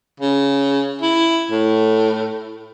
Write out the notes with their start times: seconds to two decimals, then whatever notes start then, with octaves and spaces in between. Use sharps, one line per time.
0.20 C#3
1.01 E4
1.51 A2